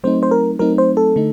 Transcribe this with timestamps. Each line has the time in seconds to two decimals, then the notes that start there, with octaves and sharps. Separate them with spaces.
0.04 F#3 A3 C4 D#4 C5
0.23 C5
0.31 A#4
0.59 F#3 A3 C4 D#4 A#4
0.78 C5
0.97 A4
1.16 D3 A3 D#4